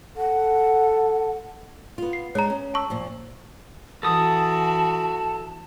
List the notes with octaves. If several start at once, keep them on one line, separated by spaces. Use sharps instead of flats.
A4 F#5
B3 F4
C7
G#3 D4 D#4 C#5 A#5
C#4
A5 C#6 E6
A#2 F3
E3 F#4 A4 A5 D#6